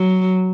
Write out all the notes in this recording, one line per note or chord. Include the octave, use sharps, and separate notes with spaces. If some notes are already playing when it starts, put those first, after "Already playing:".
Already playing: F#3